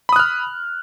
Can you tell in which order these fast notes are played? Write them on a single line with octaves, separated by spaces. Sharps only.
B5 D#6 F#6 F6